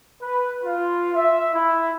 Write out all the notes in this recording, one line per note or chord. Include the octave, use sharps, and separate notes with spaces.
B4
F4
E5
E4